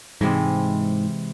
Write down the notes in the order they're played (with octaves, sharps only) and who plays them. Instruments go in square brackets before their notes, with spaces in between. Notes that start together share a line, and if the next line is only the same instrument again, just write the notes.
[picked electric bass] G#2 [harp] C3 E3 G#3